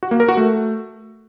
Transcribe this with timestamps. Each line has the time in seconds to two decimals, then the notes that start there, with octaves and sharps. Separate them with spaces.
0.03 F#4
0.11 A#3
0.20 A#4
0.28 F#4
0.37 A3